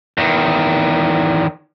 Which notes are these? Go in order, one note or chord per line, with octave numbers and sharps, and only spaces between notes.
E2 D#3